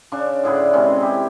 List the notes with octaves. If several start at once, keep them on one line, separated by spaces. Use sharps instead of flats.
C#3 D4 C#6
A2 D3 G#4 B4
C3 E3 G#3 C#4
E4 G4